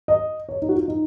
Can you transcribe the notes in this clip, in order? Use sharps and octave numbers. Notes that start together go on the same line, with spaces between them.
D#5
C#5
D#4
F#4
F4
D#4